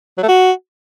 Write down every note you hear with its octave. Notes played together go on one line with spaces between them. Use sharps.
F#3
A3
F#4